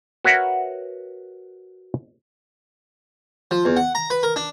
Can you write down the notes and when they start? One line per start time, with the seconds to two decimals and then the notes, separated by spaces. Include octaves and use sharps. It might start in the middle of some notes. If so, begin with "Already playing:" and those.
0.25 F#4 A#4 B4 C#5 E5 F#5
3.51 F3
3.65 E2
3.77 F#5
3.95 A#5
4.10 B4
4.23 A#4
4.36 D4